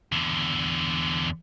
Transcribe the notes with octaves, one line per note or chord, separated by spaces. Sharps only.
E2 D3